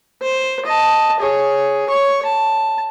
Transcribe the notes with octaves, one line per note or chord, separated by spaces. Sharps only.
C5
D#5 A5
G#4 C#5
C#5 C#6
A5